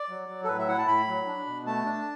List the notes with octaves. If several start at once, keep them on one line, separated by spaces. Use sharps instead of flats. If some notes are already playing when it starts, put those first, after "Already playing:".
Already playing: D5
F#3
F#3
A4
A2 B4
E5
E4 F#5
A5
A2 B5
F#3
D4
B2
A3 A5
D4